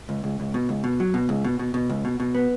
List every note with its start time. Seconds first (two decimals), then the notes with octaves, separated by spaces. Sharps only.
0.09 C#2
0.24 C#2
0.40 C#2
0.54 B2
0.69 C#2
0.84 B2
1.00 F#3
1.14 B2
1.29 C#2
1.45 B2
1.59 B2
1.74 B2
1.89 C#2
2.05 B2
2.20 B2
2.35 B3